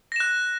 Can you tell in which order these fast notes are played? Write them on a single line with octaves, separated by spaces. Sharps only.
A#6 E7 F#6